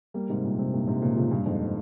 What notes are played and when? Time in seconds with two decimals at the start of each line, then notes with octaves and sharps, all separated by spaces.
0.14 G3 A#3
0.29 G#2 C3
0.44 G2 A#2
0.59 G#2 C3
0.73 G2 A#2
0.87 G#2 C3
1.02 A#2 C#3
1.16 C#3 F3
1.31 G2 A#2
1.46 F2 G#2